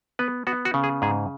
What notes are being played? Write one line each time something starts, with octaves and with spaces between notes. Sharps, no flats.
B3 B4
B3 F#4
F#4
C#3
G#4
G#2 G#4